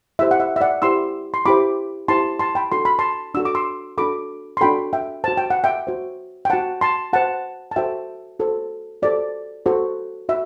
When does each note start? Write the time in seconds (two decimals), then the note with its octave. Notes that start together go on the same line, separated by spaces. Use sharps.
0.19 E4 G4 C5 E5
0.31 F#5
0.40 E5
0.56 E5
0.61 D5 F#5
0.82 E4 G4 C5 C6 E6
1.34 C6
1.46 E4 G4 C5 B5 D6
2.08 E4 G4 C5 A5 C6
2.39 A5 C6
2.55 G5 B5
2.72 D4 F#4 A4 C6
2.85 B5
2.99 A5 C6
3.34 D4 F#4 A4 E6
3.45 D6
3.55 C6 E6
3.98 D4 F#4 A4 B5 D6
4.57 C6
4.61 D4 F#4 A4 G5 B5
4.93 E5 G5
5.24 F#4 C5 A5
5.37 G5
5.50 F#5
5.64 E5 G5
5.87 F#4 C5
6.45 G5
6.50 F#4 C5 F#5 A5
6.81 A5 C6
7.13 F#4 C5 F#5 A5
7.71 A5
7.76 F#4 A4 C5 E5 G5
8.39 F#4 A4 C5
9.02 F#4 A4 C5 D5
9.66 F#4 A4 C5
10.29 F#4 E5